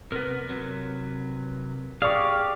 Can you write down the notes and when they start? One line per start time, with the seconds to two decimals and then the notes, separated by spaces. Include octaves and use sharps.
0.12 C3 B3 A#4 B4
0.49 C3 F#3
2.02 G4 G#4 D5 F5 C#6